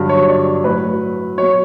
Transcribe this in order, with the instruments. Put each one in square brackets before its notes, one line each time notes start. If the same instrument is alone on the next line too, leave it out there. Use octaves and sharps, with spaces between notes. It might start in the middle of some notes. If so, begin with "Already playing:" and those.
Already playing: [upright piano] G2 D3 F#3
C#5
D5
A2 F#3 B4
B2 F#3 C#5